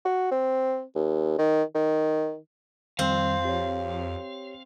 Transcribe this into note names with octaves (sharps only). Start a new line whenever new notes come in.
F#4
C4
D#2
D#3
D#3
F2 D#3 G3 C4 F5
G4 C#5